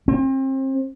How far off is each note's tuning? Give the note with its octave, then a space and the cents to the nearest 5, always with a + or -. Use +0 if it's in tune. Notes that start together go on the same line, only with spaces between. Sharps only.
C4 +35